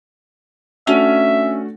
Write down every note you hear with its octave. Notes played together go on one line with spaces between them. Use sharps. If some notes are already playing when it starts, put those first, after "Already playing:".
A3 C#4 D4 F#4 E5